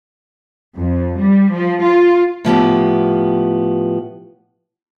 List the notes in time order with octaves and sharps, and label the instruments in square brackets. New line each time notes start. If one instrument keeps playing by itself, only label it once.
[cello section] F2
G3
F3
F4
[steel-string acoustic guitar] A2 F3 B3 G4